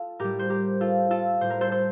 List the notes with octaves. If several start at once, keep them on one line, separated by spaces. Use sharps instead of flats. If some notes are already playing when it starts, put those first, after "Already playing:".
Already playing: F4 A4
A2 G3 G4 A#4
C5
G4 A#4
F4 A4
F4 A4
A2 G3 C5
A#4
A4 C5
A4 C5